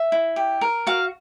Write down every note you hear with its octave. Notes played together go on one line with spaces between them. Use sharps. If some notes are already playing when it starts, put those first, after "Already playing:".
Already playing: E5
E4
G4
A#4
F#4 F5